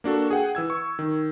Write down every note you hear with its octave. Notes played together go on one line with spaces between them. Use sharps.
A#3 D4 F#4 A4
G#4 F#5 G5
E3 E6 G#6
C#6
D#3